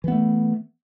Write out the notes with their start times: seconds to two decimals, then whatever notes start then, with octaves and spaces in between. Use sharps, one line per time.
0.04 E3
0.08 B3
0.12 A3